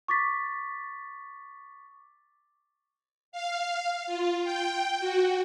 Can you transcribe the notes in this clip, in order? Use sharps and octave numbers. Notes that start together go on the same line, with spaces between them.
C#6 D6 A6 B6
F5
F4
G5
F#4